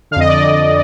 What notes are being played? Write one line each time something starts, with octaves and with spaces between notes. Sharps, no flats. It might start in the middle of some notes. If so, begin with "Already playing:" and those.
F2 D3 D#5 F5
D5
D#5